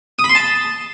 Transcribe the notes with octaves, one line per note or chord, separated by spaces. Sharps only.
D#6
B5
C6
A5